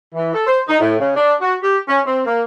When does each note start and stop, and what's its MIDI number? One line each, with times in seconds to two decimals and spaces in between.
0.14 0.31 52
0.34 0.43 69
0.47 0.61 72
0.68 0.77 63
0.80 0.98 45
1.00 1.16 49
1.16 1.33 62
1.41 1.55 66
1.63 1.78 67
1.88 2.00 61
2.06 2.21 60
2.26 2.42 58